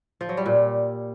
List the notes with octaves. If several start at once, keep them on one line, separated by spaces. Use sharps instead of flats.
F3
F#3
G3
A#2